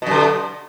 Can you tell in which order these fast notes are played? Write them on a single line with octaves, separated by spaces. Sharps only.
B2 F#2 D3